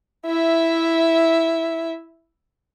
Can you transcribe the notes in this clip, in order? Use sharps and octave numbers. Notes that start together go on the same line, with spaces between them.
E4 E5